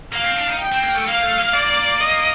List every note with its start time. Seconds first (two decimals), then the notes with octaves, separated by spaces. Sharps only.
0.12 A#3 F5
0.24 C4
0.36 D4
0.48 D#4
0.59 G5
0.72 C4
0.83 A#3
0.95 A3
1.07 A#3 F5
1.22 A3
1.38 A#3
1.53 D5
2.01 D#5